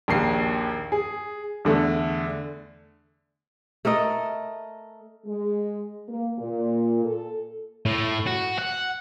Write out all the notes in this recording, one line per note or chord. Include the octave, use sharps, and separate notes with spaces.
A#1 D#2 C7
G#4
E2 D3 A3
A3 A4 A#4 D#5
G#3
A#3
A#2
A4
A2
F#4
F#5